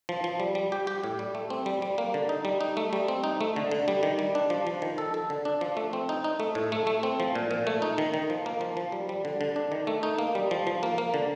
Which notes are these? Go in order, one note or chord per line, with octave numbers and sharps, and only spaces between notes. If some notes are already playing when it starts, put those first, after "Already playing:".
F3
F3
G3
G3
G4
G4
A2
G3
A3
C4
G3
G3
A#3
D3
D#4
G3
D#4
A3
G3
C4
D#4
A3
D3
D3
G3
D#3
G3
D4
F3
F3
D#3
A4
A4
D3
D4
F3
A3
C4
D#4
D#4
A3
A2
A3
A3
C4
F3
A#2
A#2
A3
D#4
D#3
D#3
F3
A#3
F3
F3
G3
G3
D3
D3
D4
D#3
A3
D#4
A#3
G3
F3
F3
A#3
A#3
D3